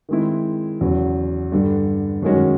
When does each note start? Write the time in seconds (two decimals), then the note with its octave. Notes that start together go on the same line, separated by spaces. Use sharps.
0.09 D#3 G#3 C4 E4
0.81 E2 C#3 F#3
1.52 G2 D3 G3
2.23 F#2 D#3 G#3 C#4 F#4